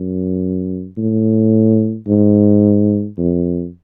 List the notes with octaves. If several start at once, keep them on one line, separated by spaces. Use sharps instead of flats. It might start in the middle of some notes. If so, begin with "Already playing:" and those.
Already playing: F#2
A2
G#2
F2